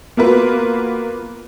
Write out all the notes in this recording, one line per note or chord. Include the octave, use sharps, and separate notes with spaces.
A#3 B3 F4 F#4 A#4 B4